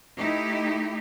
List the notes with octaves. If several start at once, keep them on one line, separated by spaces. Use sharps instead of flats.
A3 D#4 E4 G4